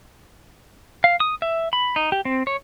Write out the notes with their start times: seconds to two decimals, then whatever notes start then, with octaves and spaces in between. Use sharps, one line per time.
1.04 F5
1.20 D#6
1.42 E5
1.73 B5
1.96 D#4
2.12 G4
2.25 C4
2.47 C#5